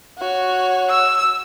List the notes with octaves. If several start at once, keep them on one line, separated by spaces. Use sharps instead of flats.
F#4 C#5
E6